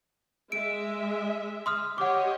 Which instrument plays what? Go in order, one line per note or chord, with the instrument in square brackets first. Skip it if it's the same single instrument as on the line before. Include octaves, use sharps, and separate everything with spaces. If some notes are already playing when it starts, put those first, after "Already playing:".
[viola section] G#3 E5 [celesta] D7
[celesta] C6 D#6 F6
[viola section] G4 C#5 D#5 [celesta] F#5 D6